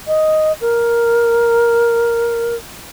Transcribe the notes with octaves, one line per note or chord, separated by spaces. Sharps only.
D#5
A#4